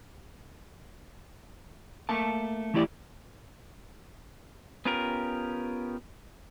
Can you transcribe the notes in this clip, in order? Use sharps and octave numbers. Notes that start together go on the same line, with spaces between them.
A3 A#3 A#4 A5
E3 A3 E4 G4 D5
B3 C#4 F4 G4 A#4